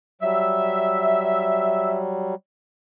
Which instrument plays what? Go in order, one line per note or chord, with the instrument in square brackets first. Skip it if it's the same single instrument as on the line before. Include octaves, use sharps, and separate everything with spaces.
[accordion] F#3 G3 [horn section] E5